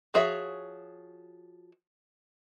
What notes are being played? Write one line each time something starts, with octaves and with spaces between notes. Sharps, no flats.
F3 F#4 G#4 C#5 E5